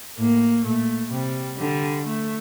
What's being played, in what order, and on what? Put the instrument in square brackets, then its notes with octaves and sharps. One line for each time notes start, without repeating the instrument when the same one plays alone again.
[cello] A2 [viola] A#3
[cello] A#2 [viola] A3
[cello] C3 [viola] G3
[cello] D3 [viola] G3
[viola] A3